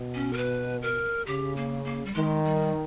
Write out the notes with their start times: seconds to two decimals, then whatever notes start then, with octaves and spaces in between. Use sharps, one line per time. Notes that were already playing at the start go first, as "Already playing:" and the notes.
Already playing: B2
0.15 C#4
0.33 A#4
0.37 B4
0.82 A#4
1.26 C#3 G4
1.56 A#3
1.85 A#3
2.05 G3
2.14 D#3 G#3
2.45 G3